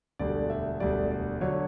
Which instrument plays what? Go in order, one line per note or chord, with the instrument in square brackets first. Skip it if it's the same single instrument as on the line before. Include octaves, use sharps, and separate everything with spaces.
[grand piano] E1 D2 D3 G3 D5
E5
E1 D2 D3 G3 D5
D5
D3 F#3 C#5